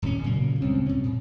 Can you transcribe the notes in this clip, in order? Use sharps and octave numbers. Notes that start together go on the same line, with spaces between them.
D#1 A#2 A#3 C#4
A#2 C#3 F#3 A#3
C#2 G3 C4 C#4
C3 C#4
A#2